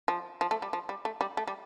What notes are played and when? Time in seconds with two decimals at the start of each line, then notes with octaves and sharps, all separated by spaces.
0.08 F3
0.41 F3
0.51 A3
0.62 G3
0.73 F3
0.89 G3
1.05 A3
1.21 G3
1.37 A3
1.48 G3